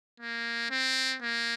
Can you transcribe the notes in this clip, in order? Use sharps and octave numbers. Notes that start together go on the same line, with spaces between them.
A#3
C4
A#3